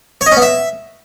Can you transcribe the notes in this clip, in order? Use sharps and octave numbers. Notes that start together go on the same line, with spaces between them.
C#5
D#5
C#4
B3
E5